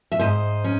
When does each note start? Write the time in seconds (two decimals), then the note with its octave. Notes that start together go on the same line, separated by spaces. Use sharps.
0.12 E5
0.19 G#2 C5 D#5
0.64 C#4